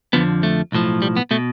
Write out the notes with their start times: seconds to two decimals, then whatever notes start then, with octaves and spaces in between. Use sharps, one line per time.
0.13 F2 D3 F3 B3
0.43 A3
0.72 B1 A2 F3
1.02 G3
1.17 B3
1.31 B2 A3